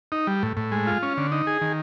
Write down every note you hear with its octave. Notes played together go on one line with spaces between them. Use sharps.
D#4
G3
A2
A2
G#3
F4
C#4
D3
D#4
G#4
D#3